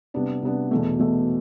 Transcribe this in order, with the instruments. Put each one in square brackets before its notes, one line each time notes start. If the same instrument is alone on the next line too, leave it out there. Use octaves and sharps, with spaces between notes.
[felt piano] C3 G3 B3 D4
C3 G3 B3 D4
E2 B2 A3
E2 B2 A3